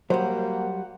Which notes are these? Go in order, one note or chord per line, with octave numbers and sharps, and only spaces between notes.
F#3 G3 A#3 C5 F#5